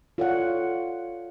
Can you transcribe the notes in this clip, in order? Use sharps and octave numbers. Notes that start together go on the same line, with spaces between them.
F4 A4 C#5 D5 F5 F#5